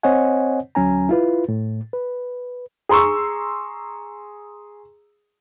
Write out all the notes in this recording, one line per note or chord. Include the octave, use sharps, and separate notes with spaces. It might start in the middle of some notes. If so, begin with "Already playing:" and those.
C4 C5 C#5 D#5 F#5 G#5
D2 F#3 C#4 G#5 A#5
E4 F4 B4
A2
B4
G#4 A#5 C6 C#6 E6